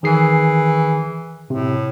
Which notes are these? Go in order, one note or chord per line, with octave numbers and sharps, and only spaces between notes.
D#3 E3 G#4 C7
A2 C3